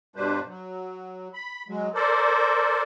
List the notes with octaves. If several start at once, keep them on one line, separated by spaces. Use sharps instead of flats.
G2 B2 G3 D4 B4 C5
F#3
B5
F#3 G#3
A4 A#4 C5 D5